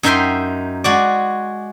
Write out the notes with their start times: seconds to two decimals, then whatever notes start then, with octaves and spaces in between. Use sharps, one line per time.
0.03 F#2 D#4 D#5 E5 G5 C6
0.84 G#3 F#4 D5